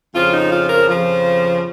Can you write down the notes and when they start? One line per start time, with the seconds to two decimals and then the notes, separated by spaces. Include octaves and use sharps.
0.14 F2 C#3 F3 F4
0.32 D#4
0.51 F4
0.68 A#4
0.87 F2 C#3 F3